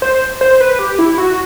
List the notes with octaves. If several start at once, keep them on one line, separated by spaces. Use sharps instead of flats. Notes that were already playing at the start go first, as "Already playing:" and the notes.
C5
C5
B4
G4
E4
F#4